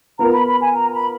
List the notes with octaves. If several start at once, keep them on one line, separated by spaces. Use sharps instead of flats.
B3 F4 A#4 A#5
B5
B5
G#5
A#5
B5